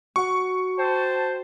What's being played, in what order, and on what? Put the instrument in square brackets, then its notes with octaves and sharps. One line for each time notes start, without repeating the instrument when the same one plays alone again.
[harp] F#4 F#5 [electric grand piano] C#6
[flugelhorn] C5 [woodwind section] G5 A5